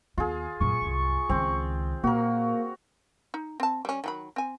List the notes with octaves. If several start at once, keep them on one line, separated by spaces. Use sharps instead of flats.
D#2 B3 F4 G#4
F#2 A#2 C#6
C2 F#2
C#2 D#3 C4
A#2 A#3 F#4 A#4
D#4
C4 A5
G3 C#4
D#3 F#3 B5
C4 G#5